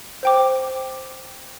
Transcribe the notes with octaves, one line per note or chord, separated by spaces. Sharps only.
C5 G5 D6